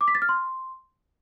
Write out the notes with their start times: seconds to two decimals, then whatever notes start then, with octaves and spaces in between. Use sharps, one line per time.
0.01 D6
0.08 B6
0.15 A6
0.22 F6
0.29 C6